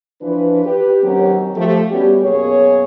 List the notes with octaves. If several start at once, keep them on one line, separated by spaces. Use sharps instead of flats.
E3 F3 D4 F4 B4
G4 B4
D#2 F#3 C4 C#4 G4 A#4
F3 A3 G4
G3 B3 C#4 F#4 G4
F#2 B2 A#3 G#4 C#5